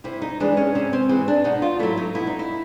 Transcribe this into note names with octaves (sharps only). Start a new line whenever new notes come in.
C3 E4
D#4
E3 G#3 D4
C#4
C3 C#4
C4
E3 G#3
D4
B2 D#4
F4
F#3 A3 E4
D#4
B2 E4
D#4
E4